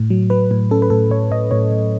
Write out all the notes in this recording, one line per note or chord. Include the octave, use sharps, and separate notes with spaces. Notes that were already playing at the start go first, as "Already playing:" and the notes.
Already playing: A2
F#3
F#3 B4
A2
C#4 A4
B4
A2 A4
A2 C#5
A2 D#5
A2 C#5
A2